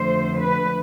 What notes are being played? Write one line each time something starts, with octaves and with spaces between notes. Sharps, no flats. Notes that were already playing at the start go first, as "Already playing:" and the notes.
Already playing: F2 D3 A3 C5
B4